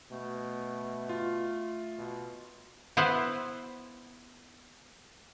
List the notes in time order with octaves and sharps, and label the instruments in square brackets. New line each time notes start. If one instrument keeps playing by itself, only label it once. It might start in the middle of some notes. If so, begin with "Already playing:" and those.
[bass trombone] B2 [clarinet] A3
[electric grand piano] F4
[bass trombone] B2
[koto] B3 E4 B4 C5 E5 F#5